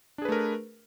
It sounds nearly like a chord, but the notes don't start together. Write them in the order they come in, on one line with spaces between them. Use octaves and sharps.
D4 G#4 B4 A3 A#4